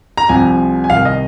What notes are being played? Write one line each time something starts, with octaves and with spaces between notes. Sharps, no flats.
A#5
C2 C3 F3 G#5
G#5
C2 C3 D#3 F5
D#5